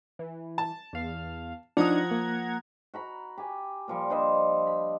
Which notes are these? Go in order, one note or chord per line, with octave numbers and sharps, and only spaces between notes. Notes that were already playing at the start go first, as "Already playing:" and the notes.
E3
A5
E2 F5
F3 D4 D#4 F#5 A#5 D#6 G#6
A#3
F#4 A#5 B5
G4 G#5
A#2 F3 G3
D4 C5 D#5 B5
B5